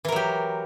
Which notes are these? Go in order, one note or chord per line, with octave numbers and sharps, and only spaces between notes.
E3 F#3 G4 A#4